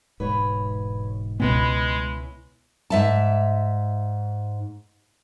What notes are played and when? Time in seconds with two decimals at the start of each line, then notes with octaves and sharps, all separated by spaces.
0.20 E1 G#2 B4 C#5
1.40 C#2 B2 G#3 B3 C#4 E4 B4
2.90 G#2 E5 A5